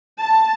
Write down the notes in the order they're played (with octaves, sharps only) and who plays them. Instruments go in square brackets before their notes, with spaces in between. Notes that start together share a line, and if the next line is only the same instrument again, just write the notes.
[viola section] A5